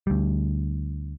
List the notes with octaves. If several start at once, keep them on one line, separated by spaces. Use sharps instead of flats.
D2 G3